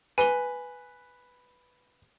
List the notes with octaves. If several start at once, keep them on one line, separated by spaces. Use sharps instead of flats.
B4 G#5 G7